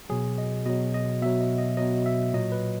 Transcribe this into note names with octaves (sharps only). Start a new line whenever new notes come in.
B2 F#3 G#4
D#5
B2 F#3 D#5
D#5
B2 F#3 E5
D#5
D#5
B2 F#3 D#5
E5
A#2 F#3 D#5
B4